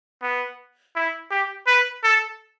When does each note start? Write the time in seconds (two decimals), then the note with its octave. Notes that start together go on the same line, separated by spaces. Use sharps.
0.22 B3
0.95 E4
1.31 G4
1.67 B4
2.03 A4